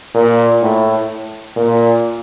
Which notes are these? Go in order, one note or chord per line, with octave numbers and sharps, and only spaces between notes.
A#2
A2
A#2